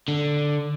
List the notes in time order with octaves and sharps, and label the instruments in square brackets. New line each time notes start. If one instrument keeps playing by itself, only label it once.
[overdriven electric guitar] D3